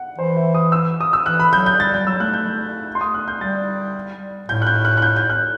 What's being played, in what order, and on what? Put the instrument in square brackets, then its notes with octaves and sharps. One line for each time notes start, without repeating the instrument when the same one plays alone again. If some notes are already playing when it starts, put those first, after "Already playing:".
Already playing: [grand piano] F#5
[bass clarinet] E3 [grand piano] C5
[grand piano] E5
D#6
E6
D#6
E6
[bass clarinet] E3 [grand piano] F#6
[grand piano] B5
[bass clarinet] F#3 [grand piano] G6
[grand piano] G6
[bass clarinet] G3 [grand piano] A6
[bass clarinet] G3 [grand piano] G6
[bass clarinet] F#3 [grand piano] E6
[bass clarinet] A3 [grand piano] F#6
[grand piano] G6
C6
D#6
F#6
G6
[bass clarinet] G3 [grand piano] A6
[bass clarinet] A2 [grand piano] G6
[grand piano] F#6
G6
F#6
F#6
G6
G6
F#6